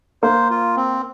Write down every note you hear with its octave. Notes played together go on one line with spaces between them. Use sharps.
A#3 C5
F4
C4